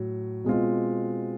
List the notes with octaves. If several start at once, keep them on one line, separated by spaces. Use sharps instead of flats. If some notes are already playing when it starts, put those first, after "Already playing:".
Already playing: A2 F#3
B2 G#3 C4 F4